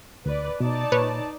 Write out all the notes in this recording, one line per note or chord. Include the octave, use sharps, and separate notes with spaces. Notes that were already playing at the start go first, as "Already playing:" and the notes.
D2 B4 D5
B2 D#4 D5 A5
A#2 B4 C#5